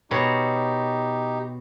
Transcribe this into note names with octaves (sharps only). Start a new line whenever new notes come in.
B2 D#4 G4 C#5